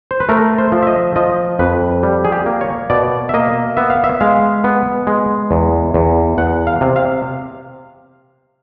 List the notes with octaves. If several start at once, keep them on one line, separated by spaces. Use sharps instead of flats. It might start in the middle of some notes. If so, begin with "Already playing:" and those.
C5
B4
A3 A#4
C5
F3
E5
D#5
F3 D#5
F2 B4
G3
G#4
G4
A#3
C#5
B2 D5
E5
A#3 D#5
B3 E5
F5
E5
G#3 F5
B3
G#3
E2
E2
E2 F#5
F5
C3
F5